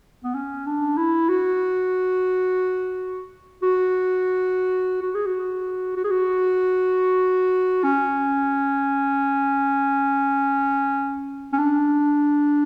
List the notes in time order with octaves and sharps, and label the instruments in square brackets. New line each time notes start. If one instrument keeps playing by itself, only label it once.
[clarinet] B3
C#4
D4
E4
F#4
F#4
F#4
G#4
F#4
F#4
G#4
F#4
C#4
C#4
D4